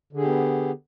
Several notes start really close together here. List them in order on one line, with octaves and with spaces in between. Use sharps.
D3 G#4 G4 B3